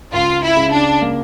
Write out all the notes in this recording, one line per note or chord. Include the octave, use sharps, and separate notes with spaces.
C#2 F4
E4
C#3
D4
A#3